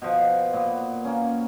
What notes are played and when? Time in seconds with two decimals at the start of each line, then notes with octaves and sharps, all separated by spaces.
0.02 B2 F3
0.53 A#2 B3
1.04 A#3 C#4